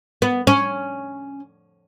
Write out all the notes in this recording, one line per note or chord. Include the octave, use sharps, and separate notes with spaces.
B3
C#4